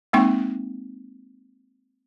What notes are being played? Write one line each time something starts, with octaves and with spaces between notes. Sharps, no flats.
G#3 A#3 C4 D#4 G5 C#6